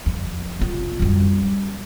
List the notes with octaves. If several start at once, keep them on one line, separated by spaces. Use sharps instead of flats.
F2
C3 F4
F#2 G3